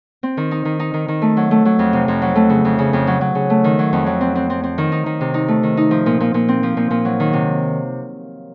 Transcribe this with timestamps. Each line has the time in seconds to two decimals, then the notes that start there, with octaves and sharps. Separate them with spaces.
0.23 C4
0.37 D#3
0.51 D#4
0.65 D#3
0.79 D#4
0.94 D#3
1.08 D#3
1.22 A3
1.37 F#3
1.51 A3
1.65 F#3
1.79 F2
1.93 C3
2.08 F2
2.22 F#3
2.35 A3
2.50 C#3
2.65 F2
2.79 C#3
2.93 F2
3.07 F#3
3.21 F#3
3.35 C#3
3.50 A3
3.64 D#3
3.79 F#3
3.93 F2
4.06 F#3
4.21 C4
4.35 C4
4.50 C4
4.63 C4
4.78 D#3
4.92 D#4
5.06 D#3
5.21 C3
5.34 D#4
5.48 A3
5.63 D#3
5.77 D#4
5.91 F3
6.06 A#2
6.20 A#2
6.34 A#2
6.48 C4
6.63 F3
6.77 A#2
6.90 A#2
7.05 F#3
7.20 D#3
7.33 C3